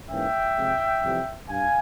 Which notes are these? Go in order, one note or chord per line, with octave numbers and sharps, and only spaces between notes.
G#2 E3 A#3 C#4 E5 G5
C3 F3 G#3
F2 C3 E3 G3
G2 F5 G#5